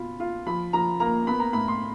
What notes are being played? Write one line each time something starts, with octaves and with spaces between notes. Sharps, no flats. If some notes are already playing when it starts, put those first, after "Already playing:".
Already playing: B2 F4 B5
F4
F3 B5
F3 A#5
A#3 A#5
B3 B5
A#5
A2 B5
C6